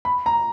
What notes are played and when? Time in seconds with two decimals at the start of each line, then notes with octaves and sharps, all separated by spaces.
0.05 B5
0.26 A#5